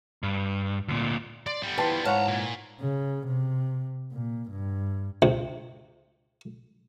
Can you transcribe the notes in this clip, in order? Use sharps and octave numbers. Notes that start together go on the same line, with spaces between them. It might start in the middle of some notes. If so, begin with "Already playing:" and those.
G2
D2 A#2
D5 C6
G3 B3
E3 F4 B4 G5 A5 C6
G#2 C#5 F5 F#5 A5 A#5 C#6
A#2
C#3
C3
A#2
G2
C#2 C3